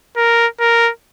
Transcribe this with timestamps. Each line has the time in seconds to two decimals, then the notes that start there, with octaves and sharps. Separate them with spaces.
0.16 A#4
0.60 A#4